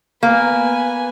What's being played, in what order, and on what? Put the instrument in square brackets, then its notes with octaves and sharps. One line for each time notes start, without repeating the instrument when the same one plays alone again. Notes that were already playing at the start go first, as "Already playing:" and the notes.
[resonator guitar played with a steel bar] A#3 [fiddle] B3 G#5